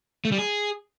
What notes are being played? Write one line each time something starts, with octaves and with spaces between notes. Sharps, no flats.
A3
G3
G#4